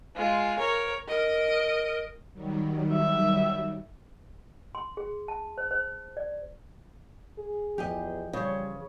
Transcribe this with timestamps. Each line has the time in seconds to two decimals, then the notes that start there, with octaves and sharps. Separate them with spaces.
0.16 G#3 F4
0.59 A#4 C#5
1.09 A#4 D#5
2.33 D#3 F#3 G3
2.92 E5
4.75 C6
4.97 G#4
5.28 A5
5.58 C5
5.71 C5
6.17 D5
7.38 G#4
7.78 E2 E3 F3 G4 G#4 D#5
8.33 C#3 G3 C5 C#5